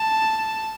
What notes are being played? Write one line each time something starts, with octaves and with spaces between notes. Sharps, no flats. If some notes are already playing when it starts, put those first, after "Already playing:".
Already playing: A5